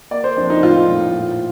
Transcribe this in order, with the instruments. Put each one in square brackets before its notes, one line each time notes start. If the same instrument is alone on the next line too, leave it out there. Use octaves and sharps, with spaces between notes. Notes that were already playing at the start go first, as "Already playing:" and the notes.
[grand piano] A#3 D5
C5
F2 D4
D#4
A2 F4
A2
A#2